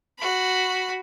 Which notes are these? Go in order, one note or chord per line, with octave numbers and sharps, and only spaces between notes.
F#4 B5